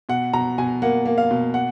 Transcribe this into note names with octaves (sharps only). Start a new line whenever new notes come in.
B2 F#5
B2 A#5
B2 G#5
A#3 F#5
A#3
F5
B2
F#5